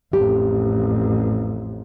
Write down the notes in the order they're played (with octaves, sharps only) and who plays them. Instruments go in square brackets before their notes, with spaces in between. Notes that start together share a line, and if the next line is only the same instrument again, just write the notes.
[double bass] A1 F2 [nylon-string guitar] G4